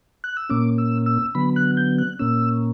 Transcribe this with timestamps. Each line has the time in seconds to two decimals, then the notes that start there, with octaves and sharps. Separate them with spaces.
0.24 F#6
0.37 E6
0.50 A#2 A#3 C#4 D6
0.78 E6
1.06 E6
1.35 D3 F#3 B3 B5
1.56 F#6
1.77 G6
1.98 F#6
2.19 A#2 A#3 C#4 E6